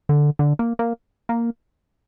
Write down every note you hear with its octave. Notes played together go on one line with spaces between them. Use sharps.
D3
D3
A#3
A#3
A#3